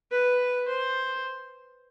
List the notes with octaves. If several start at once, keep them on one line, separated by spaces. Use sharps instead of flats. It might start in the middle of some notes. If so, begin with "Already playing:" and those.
B4
C5